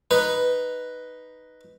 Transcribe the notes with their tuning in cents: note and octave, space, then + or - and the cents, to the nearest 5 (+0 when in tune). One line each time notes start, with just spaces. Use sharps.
D#4 +0 B4 +0